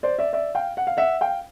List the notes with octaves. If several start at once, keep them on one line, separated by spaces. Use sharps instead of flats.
C5 D5
D5 E5
D5 E5
F5 G5
F#5
F5
E5 F#5
F5 G5